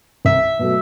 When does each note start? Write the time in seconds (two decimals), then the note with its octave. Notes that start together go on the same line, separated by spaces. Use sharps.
0.25 C2 E5
0.59 B2 F#3 A3